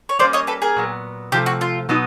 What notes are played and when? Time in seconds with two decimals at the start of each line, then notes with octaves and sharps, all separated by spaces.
0.09 C#5
0.19 G3 A#3 C#4 C5 D5
0.33 C#5 D#5
0.47 A4 B4
0.62 G#4 A#4
0.76 A#2 F#3 B3
1.32 C3 F3 A3 G4
1.46 F#4
1.61 F4
1.89 B2 F#3 B3 D#4 F#4